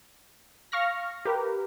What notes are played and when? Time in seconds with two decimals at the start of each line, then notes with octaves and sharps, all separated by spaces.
0.72 F5 C#6 F6 A#6
1.25 G4 A#4 B4